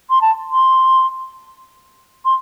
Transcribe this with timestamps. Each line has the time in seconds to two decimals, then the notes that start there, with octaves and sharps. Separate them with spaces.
0.10 C6
0.21 A5
0.51 C6
2.25 C6